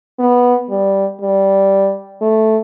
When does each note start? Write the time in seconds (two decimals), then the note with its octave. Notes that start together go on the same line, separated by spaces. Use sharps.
0.19 B3
0.70 G3
1.21 G3
2.22 A3